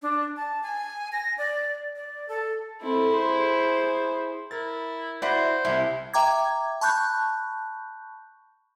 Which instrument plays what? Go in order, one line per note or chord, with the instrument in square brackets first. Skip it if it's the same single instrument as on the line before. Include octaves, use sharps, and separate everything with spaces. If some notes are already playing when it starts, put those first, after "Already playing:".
[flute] D4
A5
G#5
A#6
D5
D5
A4
[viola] C4 A4 [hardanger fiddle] E4
[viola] G#4 C5
[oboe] E4 [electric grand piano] A#4 A6
[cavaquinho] E4 F#4 [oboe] C5 [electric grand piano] D5 F#5 B5
[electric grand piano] C2 C3 [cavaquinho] E4
[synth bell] E5 G5 A#5 D6 G#6
A5 B5 C#6 F#6 G6